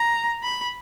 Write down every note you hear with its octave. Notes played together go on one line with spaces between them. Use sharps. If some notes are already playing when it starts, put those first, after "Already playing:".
Already playing: A#5
B5